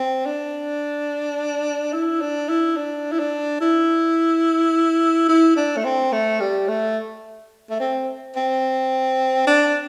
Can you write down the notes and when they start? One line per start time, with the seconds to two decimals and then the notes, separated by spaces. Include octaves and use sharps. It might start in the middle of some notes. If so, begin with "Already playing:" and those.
Already playing: C4
0.26 D4
1.93 E4
2.21 D4
2.49 E4
2.77 D4
3.12 E4
3.19 D4
3.61 E4
5.29 E4
5.56 D4
5.77 A3
5.84 C4
6.12 A3
6.40 G3
6.68 A3
7.70 A3
7.80 C4
8.36 C4
9.47 D4